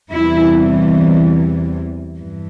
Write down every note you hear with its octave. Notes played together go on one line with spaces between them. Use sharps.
E2 C3 E3 G3 E4
G2 E3